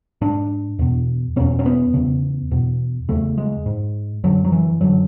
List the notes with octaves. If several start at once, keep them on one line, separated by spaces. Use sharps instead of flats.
G#2 D4
E2 B2
E2 B2 C#4
C#4
B3
E2 C#3
E2 B2
E2 C#3 A3
G#3
G#2
F#2 D3 F#3
F#3
E3
F#2 D3 F#3